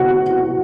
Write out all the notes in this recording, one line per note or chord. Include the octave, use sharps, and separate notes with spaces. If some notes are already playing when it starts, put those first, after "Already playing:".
Already playing: C3 F#4 F#5